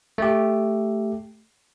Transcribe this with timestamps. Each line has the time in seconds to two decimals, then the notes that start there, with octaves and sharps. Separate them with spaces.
0.18 A3 G4